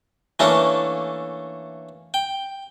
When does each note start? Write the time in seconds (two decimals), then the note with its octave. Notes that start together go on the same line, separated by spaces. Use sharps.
0.39 E3 A3 A#3 C#4 D4 A4
2.14 G5